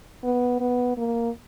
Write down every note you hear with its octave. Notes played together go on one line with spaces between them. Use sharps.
B3
B3
A#3